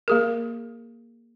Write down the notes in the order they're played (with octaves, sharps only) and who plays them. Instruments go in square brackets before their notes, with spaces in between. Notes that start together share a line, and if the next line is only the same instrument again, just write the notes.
[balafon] A#3 G#4 A#4